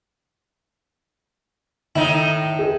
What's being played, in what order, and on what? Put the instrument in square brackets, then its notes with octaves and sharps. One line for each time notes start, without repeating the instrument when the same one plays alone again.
[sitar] A2 D#4 [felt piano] D#3 [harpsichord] E4
[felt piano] G#4